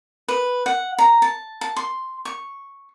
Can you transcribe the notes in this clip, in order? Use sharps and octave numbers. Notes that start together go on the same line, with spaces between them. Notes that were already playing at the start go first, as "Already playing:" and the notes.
B4
F#5
A#5
A5
A5
C6
C#6